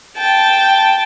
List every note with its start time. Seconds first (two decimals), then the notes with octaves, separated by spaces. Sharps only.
0.17 G5 A5